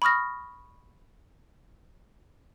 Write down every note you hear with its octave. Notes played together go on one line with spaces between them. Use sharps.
B5 C#6 D#6 F6 A#6